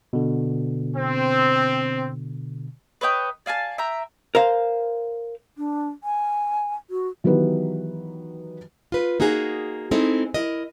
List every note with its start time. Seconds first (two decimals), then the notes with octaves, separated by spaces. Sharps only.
0.13 B2 D3
0.95 C4
3.01 B4 C#5 D#5 G5
3.46 D5 F5 G#5 A5
3.78 E5 G5 A#5
4.35 A#4 C5 F5
5.58 D4
6.04 G#5
6.90 F#4
7.24 D#3 E3 F#3 B3 G4 B4
8.92 F4 B4
9.20 A#3 D#4 F#4 G#4
9.91 G#3 C4 D#4 E4 A4
10.34 E4 A#4 D#5